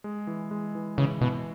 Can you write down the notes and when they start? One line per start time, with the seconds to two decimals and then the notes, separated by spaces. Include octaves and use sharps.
0.04 G#3
0.27 E3
0.51 G#3
0.75 E3
0.98 C#3 E3
1.21 B2 E3